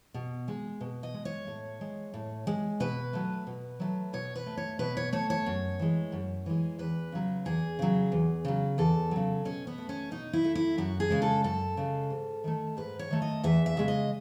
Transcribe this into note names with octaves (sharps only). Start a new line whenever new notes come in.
B2
G#3
B2
D#5
G#3
C#5
A2
G#3
A2
G#3
B2 B4
F#3 A3
B2
F#3 A3
B2 C#5
B4
A3
C#5
B2 B4
C#5
A3 C#5
C#5
F#2
E3 G#3
F#2
E3 G#3
E2 B4
C#3 F#3
E2 G#4
C#3 F#3
E2
C#3 F#3
E2 A4
C#3 F#3
B2 C#4
B3
A3
C#4
B2 D#4
E4
A3
E4
F#2 F#4
G#4
C#3 G#3
A4
F#2 A4
C#3 G#3
G#2
D#3 A3
G#2 B4
C#5
D#3 A3
D#5
E2 E5
E5
C#3 G#3
D#5